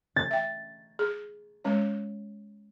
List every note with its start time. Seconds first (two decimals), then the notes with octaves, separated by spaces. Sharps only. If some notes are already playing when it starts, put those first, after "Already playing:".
0.16 A6
0.31 E5 G5
0.99 G#4
1.65 G#3 C#4 C#5